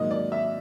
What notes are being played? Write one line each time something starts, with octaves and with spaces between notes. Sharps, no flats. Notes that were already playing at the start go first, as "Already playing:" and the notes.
Already playing: G#2 D#3 F#3 A#3 D#5
D5
E5